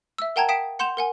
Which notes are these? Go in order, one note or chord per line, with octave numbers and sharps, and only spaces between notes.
E5 E6
A#4 F#5 G5 A5 A#5 G#6
F5 G5 D#6 B6 D7 E7
F#5 C6 G6 E7 F7
A#4 F#5 G#5